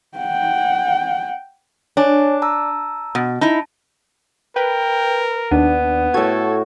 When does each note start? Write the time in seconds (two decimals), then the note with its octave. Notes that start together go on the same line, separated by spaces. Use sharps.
0.17 F#5 G5
1.97 D4 C#5 G#5 A5
2.42 A5 A#5 E6
3.15 B2
3.41 D#4 E4 A5
4.56 A#4 B4 G5
5.51 D#2 B3 D4
6.14 A2 F#4 A4 G#6